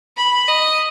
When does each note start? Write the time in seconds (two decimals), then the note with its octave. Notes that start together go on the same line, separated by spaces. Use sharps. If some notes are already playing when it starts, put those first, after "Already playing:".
0.17 B5
0.48 D#5